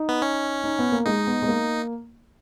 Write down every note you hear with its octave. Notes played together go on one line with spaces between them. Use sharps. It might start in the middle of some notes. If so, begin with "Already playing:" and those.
Already playing: D#4
B3
C#4
D#4
B3
A#3
G#3 D#4
B3
G#3
A#3